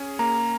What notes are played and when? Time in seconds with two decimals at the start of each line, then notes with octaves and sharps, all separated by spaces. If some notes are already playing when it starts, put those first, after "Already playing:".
Already playing: C#4 G#4
0.19 A#3 A#5